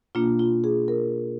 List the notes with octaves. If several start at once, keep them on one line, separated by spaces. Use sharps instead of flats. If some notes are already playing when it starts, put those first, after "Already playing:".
B2 A#3 D4 F4
F4
G#4
A#4